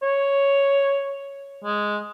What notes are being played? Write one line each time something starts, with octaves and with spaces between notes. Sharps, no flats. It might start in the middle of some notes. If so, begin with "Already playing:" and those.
C#5
G#3